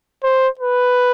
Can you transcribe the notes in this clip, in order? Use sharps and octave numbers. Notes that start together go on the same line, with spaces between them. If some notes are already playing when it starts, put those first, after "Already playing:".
C5
B4